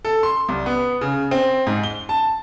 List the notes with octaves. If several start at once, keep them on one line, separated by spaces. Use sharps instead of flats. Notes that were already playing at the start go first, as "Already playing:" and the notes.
A4
C6
C2
B3
C#3
C4
G#2
G7
A5